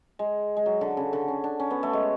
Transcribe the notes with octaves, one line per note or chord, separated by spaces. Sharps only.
G#3
G#3
F#3
D3
C#3
D3
C#4
D4
C#4
B3
A3
G#3